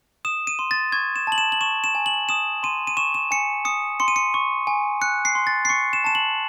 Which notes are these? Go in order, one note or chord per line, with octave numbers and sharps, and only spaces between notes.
D#6 E7
D#7
C6
A6
C#6 G#6
E7
A5 F#7
E7
F#7
C#6 E7
E7
G#5
F#7
D#6 E7
C6 D#7
D#7
C#6 E7
E7
G#5 C#7
D#6 C#7
C6 C#7
D#7
C#7
C#6
G#5
F#6 C#7
C7
C6
A6
C7
C#6 C#7
E7
A5 E7
F#7